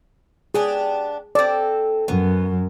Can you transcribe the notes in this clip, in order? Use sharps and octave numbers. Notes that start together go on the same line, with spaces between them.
B3 D4 G4 G#4
C4 A4 D5
F#2 B3